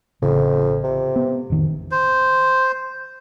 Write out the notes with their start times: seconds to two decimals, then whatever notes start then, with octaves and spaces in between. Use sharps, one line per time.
0.22 A1 F2 C#3
0.84 C3
1.16 B3
1.50 A1 F2 D#3
1.91 C5